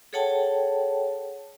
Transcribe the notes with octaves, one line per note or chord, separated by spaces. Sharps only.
G#4 A4 C#5 F#5 G5 A5